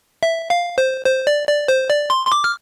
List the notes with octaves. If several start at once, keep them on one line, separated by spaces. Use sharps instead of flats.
E5
F5
C5
C5
D5
D5
C5
D5
C6
C6
D6
F6